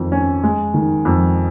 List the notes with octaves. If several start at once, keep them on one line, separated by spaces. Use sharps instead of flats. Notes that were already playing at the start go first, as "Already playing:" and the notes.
Already playing: F2 D#3
C#4
G#3
D#3
F2